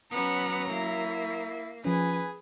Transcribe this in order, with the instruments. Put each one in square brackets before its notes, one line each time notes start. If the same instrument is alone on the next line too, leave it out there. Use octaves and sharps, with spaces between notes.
[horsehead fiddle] F#3 A#5 [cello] B3 C#4 [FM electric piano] D#6
[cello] A#3 [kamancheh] E4 E5
[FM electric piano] F3 C#4 [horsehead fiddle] G#4 [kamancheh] B4 G#5